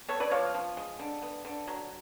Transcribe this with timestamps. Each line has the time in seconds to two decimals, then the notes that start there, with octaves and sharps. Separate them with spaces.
0.08 B3 A4 C#5
0.20 B4 D5
0.31 F3 C#5 F5
0.54 F3
0.77 G#3
0.99 D3
1.22 B3
1.45 D3
1.67 F#3